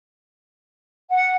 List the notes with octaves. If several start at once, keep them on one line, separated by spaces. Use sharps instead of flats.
F#5